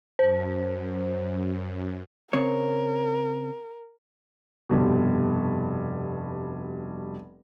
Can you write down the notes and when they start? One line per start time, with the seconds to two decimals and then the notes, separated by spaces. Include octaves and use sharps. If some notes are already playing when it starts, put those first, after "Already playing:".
0.19 F#2 C5
2.33 C#3 C4 A#4 C#5
4.69 F1 G2 B2